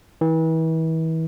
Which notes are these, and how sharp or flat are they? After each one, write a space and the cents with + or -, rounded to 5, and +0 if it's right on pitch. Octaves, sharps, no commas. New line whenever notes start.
E3 -35